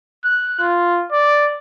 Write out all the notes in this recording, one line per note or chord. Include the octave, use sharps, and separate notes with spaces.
F#6
F4
D5